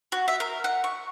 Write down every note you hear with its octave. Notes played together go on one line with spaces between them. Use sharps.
F#4
E5
A#4
F#5
C#6